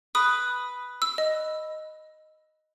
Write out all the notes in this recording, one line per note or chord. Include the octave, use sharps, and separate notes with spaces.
B4 D#6
E6
D#5